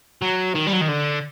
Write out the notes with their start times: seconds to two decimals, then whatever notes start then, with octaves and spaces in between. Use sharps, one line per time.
0.22 F#3
0.55 D#3
0.67 G3
0.73 F#3
0.82 D#3
0.88 D3